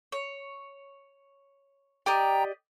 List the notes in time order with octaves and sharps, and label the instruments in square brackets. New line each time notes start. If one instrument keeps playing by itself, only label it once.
[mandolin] C#5
[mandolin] G4 D5 D#5 [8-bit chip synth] G5 A#5